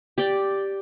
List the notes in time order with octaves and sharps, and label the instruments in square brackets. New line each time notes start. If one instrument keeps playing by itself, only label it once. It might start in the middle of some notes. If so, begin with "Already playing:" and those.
[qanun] G4 D5 G5